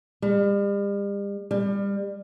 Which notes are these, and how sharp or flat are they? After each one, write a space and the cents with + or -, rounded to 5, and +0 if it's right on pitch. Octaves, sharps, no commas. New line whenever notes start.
G3 +40
G3 +30